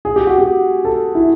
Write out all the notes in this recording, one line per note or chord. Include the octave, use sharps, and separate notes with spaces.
G#4
G4
F#4
G4
A4
E4